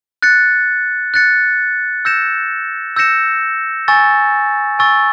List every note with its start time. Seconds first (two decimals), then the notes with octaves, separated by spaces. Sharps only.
0.22 F#6 A6 C#7
1.14 F#6 A6 C#7
2.05 E6 G6 A#6 C#7 E7
2.96 E6 G6 A#6 C#7 E7
3.88 G#5 C#6 E6 A6
4.79 G#5 C#6 E6 A6